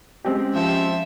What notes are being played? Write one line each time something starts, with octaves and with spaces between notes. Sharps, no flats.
G#3 C4 C#4 G4
F3 E5